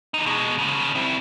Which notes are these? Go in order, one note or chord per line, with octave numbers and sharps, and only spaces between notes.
E2 D#4
B2 G#3
D#2 C#3
C4 E4